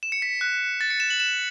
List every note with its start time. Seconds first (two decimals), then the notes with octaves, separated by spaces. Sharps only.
0.03 E7
0.12 C#7
0.22 B6
0.41 F#6
0.81 A6
0.90 C#7
1.00 E7
1.10 F#7
1.20 E7